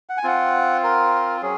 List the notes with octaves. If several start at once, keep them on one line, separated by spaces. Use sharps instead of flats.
F#5
G#5
C4 F4 F#5
A#4
F#3 C#4 G#4